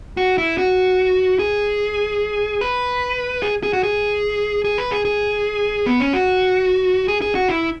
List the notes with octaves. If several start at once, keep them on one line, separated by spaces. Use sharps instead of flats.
F#4
E4
F#4
G#4
B4
G#4
G#4
F#4
G#4
G#4
B4
G#4
G#4
B3
C#4
F#4
G#4
G#4
F#4
E4